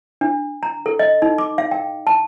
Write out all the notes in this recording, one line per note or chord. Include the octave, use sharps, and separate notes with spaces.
D4
A#5
A4
D#5
D#4
D6
F5
G5
A5